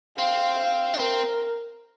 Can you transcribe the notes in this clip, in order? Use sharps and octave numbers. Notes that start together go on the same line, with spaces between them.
C4 F5
F5
D4
C4 A#4